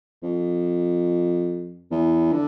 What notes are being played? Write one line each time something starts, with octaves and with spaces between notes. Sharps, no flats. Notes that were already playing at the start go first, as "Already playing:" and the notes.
F2
E2
D3